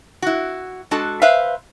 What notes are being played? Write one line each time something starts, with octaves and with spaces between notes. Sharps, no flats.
E4 F#4
G#3 D4 F#4 A4 A5
B4 C5 E5 F5